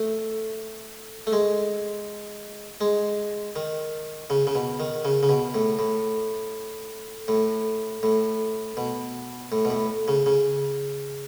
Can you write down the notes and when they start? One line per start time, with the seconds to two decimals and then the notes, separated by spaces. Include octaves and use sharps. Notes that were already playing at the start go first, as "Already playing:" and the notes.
Already playing: A3
1.27 A3
1.32 G#3
2.81 G#3
3.56 D#3
4.30 C#3
4.47 C#3
4.55 B2
4.80 D#3
5.05 C#3
5.23 C#3
5.29 B2
5.54 A2
5.79 A2
7.28 A2
8.03 A2
8.77 B2
9.52 A2
9.65 B2
9.70 A2
10.08 C#3
10.26 C#3